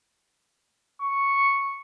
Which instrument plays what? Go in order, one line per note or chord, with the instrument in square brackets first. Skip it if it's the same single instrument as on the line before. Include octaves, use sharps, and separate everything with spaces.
[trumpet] C#6